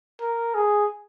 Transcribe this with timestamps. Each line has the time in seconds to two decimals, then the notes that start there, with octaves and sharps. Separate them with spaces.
0.22 A#4
0.55 G#4